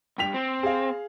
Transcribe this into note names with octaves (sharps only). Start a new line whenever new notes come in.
B1 G2 G5 B6 F7
C4
G#4 F5